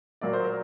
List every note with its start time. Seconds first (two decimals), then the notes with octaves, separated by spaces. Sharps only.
0.21 A#2 F#3 A#3 D5
0.33 C5
0.45 A#4